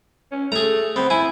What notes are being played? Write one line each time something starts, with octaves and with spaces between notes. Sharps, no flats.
C#4
A3 G#4 A#5
B3 C4
E4 G#5